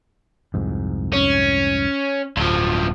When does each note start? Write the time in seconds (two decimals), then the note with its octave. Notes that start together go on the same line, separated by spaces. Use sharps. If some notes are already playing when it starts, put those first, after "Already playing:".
0.54 C2 F2 G#2
1.13 C#4
2.37 D1 G2 F3